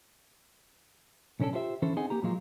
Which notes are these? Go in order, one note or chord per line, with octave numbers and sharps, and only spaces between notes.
B1 D3 C#4 D4 A4
E4 F4 G4 C5 E5
D3 E3 C#4 E4 A4 C5
C4 D#4 G#4 D#5 F#5 G#5
A#3 G4 A#5
A#2 F3 F#3 G#3 F4